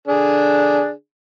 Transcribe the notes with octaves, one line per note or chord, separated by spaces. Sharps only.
D3 D4 G#4